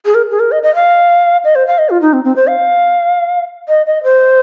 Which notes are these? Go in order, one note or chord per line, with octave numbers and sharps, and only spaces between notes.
G#4
A#4
G#4
A#4
D#5
D#5
F5
D#5
C5
F5
D#5
F4
D#4
C4
C4
C5
F5
D#5
D#5
C5